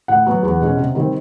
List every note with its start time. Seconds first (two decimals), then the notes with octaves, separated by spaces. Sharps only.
0.08 A2 F#5
0.26 F#3 B3
0.43 E2
0.61 B2 G#3 C#4
0.77 C3
0.95 D#3 G3 C4